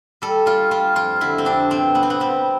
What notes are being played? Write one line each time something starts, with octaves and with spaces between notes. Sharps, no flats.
G3 A4
G3 F4
G3 F4
F2 F4
D3 E4
C4
F2 D4
B2 C4
B2 B3
C4
B3
G3 C4